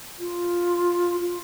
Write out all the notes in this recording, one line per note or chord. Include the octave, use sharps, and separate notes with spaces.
F4
F4